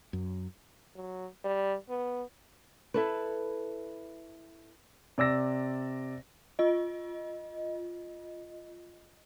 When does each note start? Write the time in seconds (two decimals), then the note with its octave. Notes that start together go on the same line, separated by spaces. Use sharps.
0.13 F#2
0.95 F#3
1.44 G3
1.89 B3
2.94 E4 A4 B4
5.18 C3 D5 E6 A#6
6.59 F4 D#5